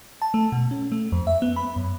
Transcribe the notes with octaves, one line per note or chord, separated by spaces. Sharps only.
A5
A3
B2
C#4
A3
F2
E5
B3
B5
F#2